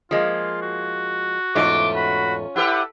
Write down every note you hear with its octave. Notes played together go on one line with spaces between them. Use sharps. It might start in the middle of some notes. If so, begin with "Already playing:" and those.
F3 G#3 A#3 F4
F#4
E2 G#2 A3 C#4 F4 D6
F#4 B5
E4 G4 A4 B4 F#5